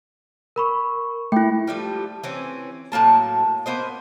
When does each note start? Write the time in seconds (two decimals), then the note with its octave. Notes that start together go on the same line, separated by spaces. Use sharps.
0.56 A#4 B5 C#6
1.32 A3 E4 G5
1.67 F3 G3 A3
2.24 E3 C4 C#4
2.92 A2 F#3 A#3 A5
3.66 A#3 B3 C5 D#5